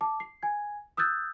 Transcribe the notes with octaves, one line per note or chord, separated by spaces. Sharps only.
A5 D6
C7
G#5 G#6
D#6 E6 F#6 G6 A6